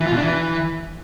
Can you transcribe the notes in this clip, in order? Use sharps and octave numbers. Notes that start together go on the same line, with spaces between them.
E3
F4
B2
D4
E3